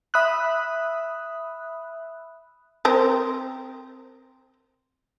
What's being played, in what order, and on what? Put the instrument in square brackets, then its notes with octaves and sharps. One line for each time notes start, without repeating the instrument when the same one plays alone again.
[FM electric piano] E5 B5 D#6 E6 F#6
[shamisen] C4 A#4 C5